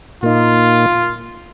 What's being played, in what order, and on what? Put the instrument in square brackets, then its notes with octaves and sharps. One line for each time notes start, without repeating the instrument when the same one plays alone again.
[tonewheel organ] A#2 A#3 D#4 [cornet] F4